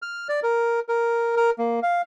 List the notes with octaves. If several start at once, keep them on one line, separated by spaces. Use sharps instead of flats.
F6
D5
A#4
A#4
A#4
A#3
F5